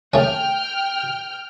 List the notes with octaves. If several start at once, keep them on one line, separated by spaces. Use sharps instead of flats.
A3 C#4 G5 F6